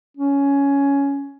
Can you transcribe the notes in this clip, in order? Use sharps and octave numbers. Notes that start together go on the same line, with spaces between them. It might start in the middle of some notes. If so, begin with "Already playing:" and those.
C#4